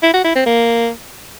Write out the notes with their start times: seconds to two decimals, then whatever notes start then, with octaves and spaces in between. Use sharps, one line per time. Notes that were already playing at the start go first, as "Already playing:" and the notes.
0.02 E4
0.13 F#4
0.24 E4
0.35 C4
0.46 A#3